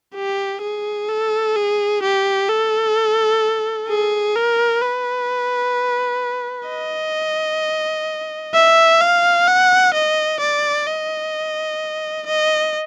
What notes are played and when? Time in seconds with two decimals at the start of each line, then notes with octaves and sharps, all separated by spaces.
0.15 G4
0.62 G#4
1.09 A4
1.56 G#4
2.02 G4
2.49 A4
3.88 G#4
4.35 A#4
4.82 B4
6.68 D#5
8.54 E5
9.01 F5
9.47 F#5
9.94 D#5
10.40 D5
10.87 D#5
12.26 D#5